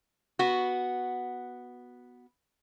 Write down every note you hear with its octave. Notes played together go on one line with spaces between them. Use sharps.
B3 F#4